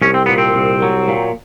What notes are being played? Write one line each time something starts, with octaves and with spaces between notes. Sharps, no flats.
C2 C#4
C4
A#2 B3
C4
C2
F#3
A#2